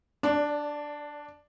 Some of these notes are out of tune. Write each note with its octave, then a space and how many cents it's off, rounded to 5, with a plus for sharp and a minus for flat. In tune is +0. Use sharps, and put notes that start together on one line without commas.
D4 +0 D5 -20